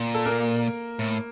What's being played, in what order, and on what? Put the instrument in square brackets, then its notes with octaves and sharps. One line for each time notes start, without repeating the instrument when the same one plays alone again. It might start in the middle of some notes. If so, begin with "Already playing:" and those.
Already playing: [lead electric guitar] A#2
[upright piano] A4
A#3 A#4
[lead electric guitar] A2